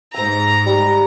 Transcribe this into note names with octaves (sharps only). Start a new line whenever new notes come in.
G#2 C5 A#5 E6
G3